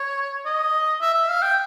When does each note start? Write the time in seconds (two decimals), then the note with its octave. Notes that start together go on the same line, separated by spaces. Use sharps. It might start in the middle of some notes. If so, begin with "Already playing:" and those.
Already playing: C#5
0.46 D#5
1.01 E5
1.14 E5
1.29 F5
1.42 G5